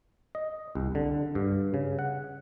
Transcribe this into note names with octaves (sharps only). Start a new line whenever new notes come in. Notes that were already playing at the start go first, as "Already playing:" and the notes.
D#5
C2
D3
G2
C#3
F#5